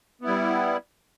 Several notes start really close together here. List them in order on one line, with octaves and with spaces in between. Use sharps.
B3 E4 G3